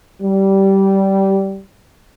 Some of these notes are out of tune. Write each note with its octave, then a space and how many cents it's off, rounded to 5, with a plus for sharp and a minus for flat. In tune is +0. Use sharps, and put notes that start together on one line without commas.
G3 -15